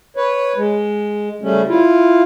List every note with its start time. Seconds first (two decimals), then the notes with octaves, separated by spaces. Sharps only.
0.17 B4 C#5
0.57 G#3
1.42 C#3 G3 A3 C#4
1.67 E4 F4